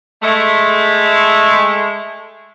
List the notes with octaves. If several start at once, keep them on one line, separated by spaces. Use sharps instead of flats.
G#3 A3